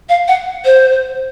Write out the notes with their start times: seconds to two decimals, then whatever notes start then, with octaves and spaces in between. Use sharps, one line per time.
0.09 F5
0.28 F#5
0.65 C5